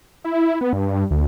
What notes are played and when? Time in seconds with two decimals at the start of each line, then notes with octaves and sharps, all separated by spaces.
0.24 E4
0.61 B3
0.73 G2
1.11 D2